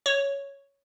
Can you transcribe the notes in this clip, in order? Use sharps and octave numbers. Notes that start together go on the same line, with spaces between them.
C#5